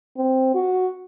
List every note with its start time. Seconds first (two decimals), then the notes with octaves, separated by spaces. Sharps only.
0.17 C4
0.55 F#4